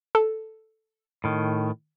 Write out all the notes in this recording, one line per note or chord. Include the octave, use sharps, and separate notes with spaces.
A4
A2 D#3